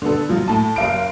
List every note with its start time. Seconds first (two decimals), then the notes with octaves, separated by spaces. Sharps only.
0.02 D3 B3 A4
0.29 F3 F#3 F4
0.48 A2 A5
0.76 F#1 F5 D7